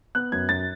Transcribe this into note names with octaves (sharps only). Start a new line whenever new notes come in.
B3 F#6
F#2 G#6
F#2 A6